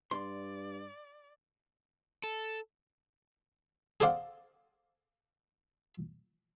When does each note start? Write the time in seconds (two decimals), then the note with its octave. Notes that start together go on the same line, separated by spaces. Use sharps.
0.11 G2 D5 C6
2.24 A4
4.00 G#4 A4 C5 D5 F5 F#5